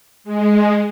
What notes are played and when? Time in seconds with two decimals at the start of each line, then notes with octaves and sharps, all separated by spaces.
0.24 G#3